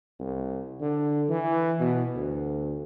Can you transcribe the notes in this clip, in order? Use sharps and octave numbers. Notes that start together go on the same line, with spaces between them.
C2
D3
E3
B2
D2